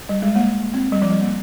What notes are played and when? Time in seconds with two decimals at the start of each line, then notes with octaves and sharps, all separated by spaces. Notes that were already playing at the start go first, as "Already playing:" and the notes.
0.09 G3
0.22 G#3
0.36 A#3
0.74 C4
0.92 G3
1.02 F3
1.11 G3
1.21 A#3